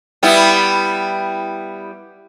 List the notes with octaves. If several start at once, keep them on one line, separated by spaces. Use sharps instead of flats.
G3 B3 E4